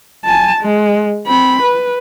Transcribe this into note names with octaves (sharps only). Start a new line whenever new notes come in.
G#5 A5
G#3
C4 B5
B4